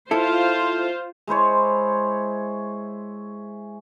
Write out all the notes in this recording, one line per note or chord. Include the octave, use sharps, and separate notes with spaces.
E4 F4 A4 C5
G#3 E4 C5 C#5